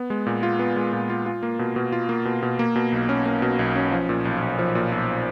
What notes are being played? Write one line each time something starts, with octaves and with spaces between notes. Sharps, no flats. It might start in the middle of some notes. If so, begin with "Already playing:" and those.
Already playing: B3
G#3
A#2
F4
B3
G#3
A#2
F4
F4
A#3
B2
B2
F4
A#3
B2
B2
A#3
B2
B1
C#4
A#3
B2
B1
C#4
F3
A#2
B1
B1
F3
A#2
B1